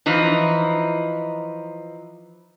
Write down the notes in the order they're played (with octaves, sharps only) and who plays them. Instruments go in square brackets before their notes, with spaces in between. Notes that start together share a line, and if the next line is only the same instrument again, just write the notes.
[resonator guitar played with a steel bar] E3 F3 D#4